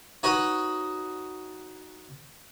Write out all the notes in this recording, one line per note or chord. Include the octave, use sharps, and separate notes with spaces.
D#4 F#4 B4 C#5 D#5 D#6